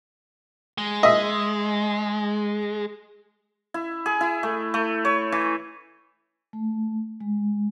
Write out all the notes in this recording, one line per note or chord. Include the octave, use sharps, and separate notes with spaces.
G#3
D#5 E5
E4
G#4
E4
A3
A3
C#5
E3
A3
G#3